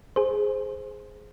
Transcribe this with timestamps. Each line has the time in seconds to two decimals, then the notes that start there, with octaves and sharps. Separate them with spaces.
0.16 G#4 C5